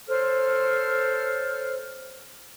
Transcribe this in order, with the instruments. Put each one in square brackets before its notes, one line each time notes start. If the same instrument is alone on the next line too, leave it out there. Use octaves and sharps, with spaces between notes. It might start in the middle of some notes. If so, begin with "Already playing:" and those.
[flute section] A4 C5 C#5 F6